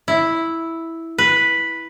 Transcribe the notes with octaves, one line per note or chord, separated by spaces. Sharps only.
E4
B4